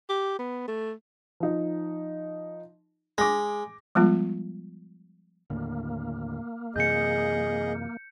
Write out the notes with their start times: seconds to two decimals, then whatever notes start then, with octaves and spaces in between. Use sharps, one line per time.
0.09 G4
0.39 B3
0.68 A3
1.40 F3 D#4
3.18 G#3 D6 A#6
3.95 F3 G3 G#3 B3 F4
5.50 D#2 A2 D3 A#3
6.76 F#2 C3 E3 G#4 D#5 G6 C#7